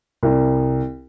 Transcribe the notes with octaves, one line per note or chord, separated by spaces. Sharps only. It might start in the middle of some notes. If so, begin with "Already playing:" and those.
C2